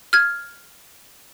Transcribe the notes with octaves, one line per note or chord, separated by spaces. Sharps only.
F6 G#6